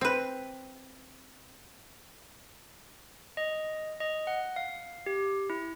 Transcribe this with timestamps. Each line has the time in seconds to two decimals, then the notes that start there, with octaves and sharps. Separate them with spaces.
0.01 C4 B4
3.37 D#5
4.00 D#5
4.27 F#5
4.56 F5
5.06 G4
5.50 E4